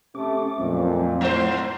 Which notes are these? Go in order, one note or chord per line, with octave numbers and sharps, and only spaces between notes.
C3 A3 C#4 D6
F2 A#2 F#3 A3 C4
G#2 C5